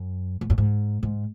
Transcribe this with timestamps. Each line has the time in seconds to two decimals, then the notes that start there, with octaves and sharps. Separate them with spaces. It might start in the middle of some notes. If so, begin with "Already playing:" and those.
Already playing: F#2
0.41 G#2
0.50 F#2
0.58 G#2
1.03 G#2